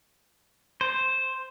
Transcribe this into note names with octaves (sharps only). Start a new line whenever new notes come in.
C5